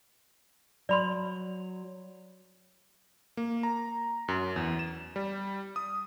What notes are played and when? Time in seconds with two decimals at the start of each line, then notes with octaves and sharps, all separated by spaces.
0.89 F#3 D5 B5 C6
3.37 A#3
3.63 A#5
4.28 F#2
4.56 E2
4.79 E7
5.16 G3
5.76 D#6